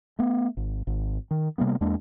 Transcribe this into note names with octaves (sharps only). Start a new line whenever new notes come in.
A3 B3
G#1
G#1
D#3
C3 G3 A#3 B3
E2 G#3 A#3 D4